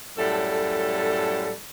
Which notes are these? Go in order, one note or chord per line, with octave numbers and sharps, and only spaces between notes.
F#2 A2 G3 A4